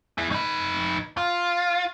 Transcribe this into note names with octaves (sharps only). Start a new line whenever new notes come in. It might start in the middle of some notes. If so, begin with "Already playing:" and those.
E4 G#4
D#4 B4
F4